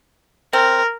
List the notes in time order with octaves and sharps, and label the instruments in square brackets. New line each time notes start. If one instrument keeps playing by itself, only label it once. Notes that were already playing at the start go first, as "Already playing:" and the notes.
[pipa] C4 [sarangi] A#4